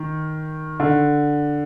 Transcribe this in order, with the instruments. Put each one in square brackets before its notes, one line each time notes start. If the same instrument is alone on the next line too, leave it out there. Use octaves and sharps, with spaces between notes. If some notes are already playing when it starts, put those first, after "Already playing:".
Already playing: [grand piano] D#3
D3